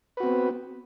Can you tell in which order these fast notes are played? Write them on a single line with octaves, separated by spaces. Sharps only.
B4 F#4 C4 B3